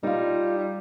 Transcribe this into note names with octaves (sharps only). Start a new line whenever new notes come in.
G3 D#4 F4